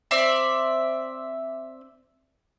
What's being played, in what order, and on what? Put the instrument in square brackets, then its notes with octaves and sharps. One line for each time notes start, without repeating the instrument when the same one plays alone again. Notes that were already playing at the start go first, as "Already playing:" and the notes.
[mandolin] C4 D5 E5